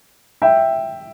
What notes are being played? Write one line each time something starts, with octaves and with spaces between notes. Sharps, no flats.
E5 G5